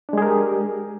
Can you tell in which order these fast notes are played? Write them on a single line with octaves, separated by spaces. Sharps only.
D4 G#3 G#4 A#4 G4